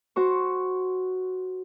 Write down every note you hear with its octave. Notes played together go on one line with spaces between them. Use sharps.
F#4 C5 C#6